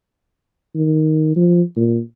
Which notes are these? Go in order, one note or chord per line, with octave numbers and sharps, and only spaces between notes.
D#3
F3
A#2